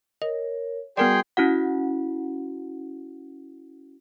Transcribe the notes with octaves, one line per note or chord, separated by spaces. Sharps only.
A#4 C#5 D#5
G3 B3 F#4 G#4 A#4 D5 G5 C6
C#4 E4 F#4 F#5